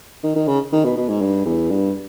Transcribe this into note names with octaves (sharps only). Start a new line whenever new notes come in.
D#3
D#3
C#3
D#3
B2
B2
G#2
G2
E2
G2